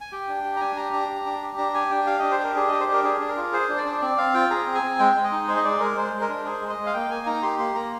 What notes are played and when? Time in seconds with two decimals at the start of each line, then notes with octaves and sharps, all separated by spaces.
0.01 G#5
0.12 G4 G5
0.29 D4
0.44 G4
0.56 A#5
0.61 D4 G#5
0.77 G4 A#5
0.93 D4 A#5
1.09 G4
1.26 D4
1.42 G4
1.58 D4 A#5
1.74 G4 G#5
1.91 D4 G5
2.07 G4 F5
2.19 D4 D#5
2.31 C5
2.40 G4 A#4
2.56 D4 G#4
2.68 G4 D#5
2.80 C5
2.88 D4 A#4
3.04 D4 G#4
3.20 D4
3.29 A#4
3.37 F4
3.53 G#4 C5
3.69 D4
3.77 D5
3.86 D4
4.02 C4 D5
4.18 C4 F5
4.34 F4 G5
4.50 G#4 A#5
4.67 C4
4.75 G#5
4.83 C4
4.99 G#3 G5
5.16 G#3
5.24 D#5
5.32 D#4
5.48 G#4 C5
5.57 D#5
5.64 G#3 D5
5.80 G#3 A#4
5.97 G#3 C5
6.13 G#3
6.21 A#4
6.29 D4
6.45 G#4 C5
6.61 G#3
6.70 D#5
6.78 G#3
6.86 F5
6.94 A#3 G5
7.10 A#3 G#5
7.26 D#4 A#5
7.43 G4 C6
7.59 A#3 C6
7.75 A#3 A#5